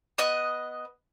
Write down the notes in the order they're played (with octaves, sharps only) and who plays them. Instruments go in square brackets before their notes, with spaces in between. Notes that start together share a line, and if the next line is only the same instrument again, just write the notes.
[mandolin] B3 D#5 F#6